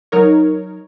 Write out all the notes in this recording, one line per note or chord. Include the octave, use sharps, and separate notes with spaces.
F#3 D#4 A#4 C#5